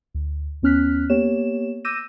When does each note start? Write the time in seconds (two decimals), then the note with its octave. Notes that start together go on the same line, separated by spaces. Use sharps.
0.14 D2
0.62 D#2 B3 C#4 F6 F#6 B6
1.10 A#3 B3 G4 C#5 E7
1.84 D6 E6 G6 A#6 D#7 E7